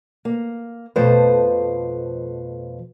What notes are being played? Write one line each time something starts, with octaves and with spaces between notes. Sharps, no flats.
A#3
F2 B2 F3 A3 B4 C5